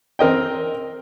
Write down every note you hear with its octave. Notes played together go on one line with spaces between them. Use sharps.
C4 A#4 D#5 G5